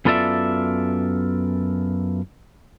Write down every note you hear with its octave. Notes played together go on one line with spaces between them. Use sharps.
F#2 B3 F4 A4 D5 E5